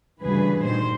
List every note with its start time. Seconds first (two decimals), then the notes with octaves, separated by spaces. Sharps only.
0.21 D2 G2 C#3 E3 G#4 B4
0.64 A#2 D#3 C5